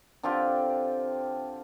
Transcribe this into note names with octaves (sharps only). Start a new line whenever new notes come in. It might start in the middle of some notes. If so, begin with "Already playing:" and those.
D3 C4 F4 G4